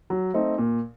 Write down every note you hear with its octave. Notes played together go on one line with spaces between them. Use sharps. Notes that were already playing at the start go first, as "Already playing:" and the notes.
F#3
A3 C4 D#4
A#2